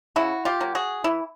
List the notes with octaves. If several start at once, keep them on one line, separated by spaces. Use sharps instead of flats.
C#3 E4 F#4
F4 G4
F#3 A#3
F#4 G#4
E3 E4